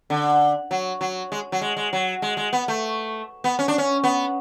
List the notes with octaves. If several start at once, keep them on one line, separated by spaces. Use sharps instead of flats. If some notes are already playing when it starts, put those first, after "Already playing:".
D3
F#3
F#3
G#3
F#3
G#3
G#3
F#3
G#3
G#3
B3
A3
B3
C#4
D4
C#4
B3